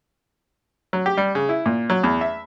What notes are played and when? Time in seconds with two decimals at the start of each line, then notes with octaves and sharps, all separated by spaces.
0.93 F#3
1.06 G4
1.17 G3
1.35 C#3
1.49 E4
1.66 A#2
1.90 F#3
2.03 E2
2.21 E5